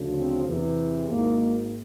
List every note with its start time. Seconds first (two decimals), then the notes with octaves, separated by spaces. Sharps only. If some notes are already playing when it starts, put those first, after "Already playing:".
Already playing: D2 C#3 F3
0.18 C4
0.47 E2 C3 E3
1.09 G#1 G#2 D#3 A#3